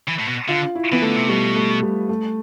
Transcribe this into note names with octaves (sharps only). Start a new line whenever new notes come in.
E3
A2
B2
D3 F4
E4
E3 B3
D3 A3
C3
B2 G3
A3
G3
A3